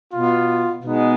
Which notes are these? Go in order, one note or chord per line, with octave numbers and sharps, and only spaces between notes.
B2 B3 F4
B2 G#3 B3 D#4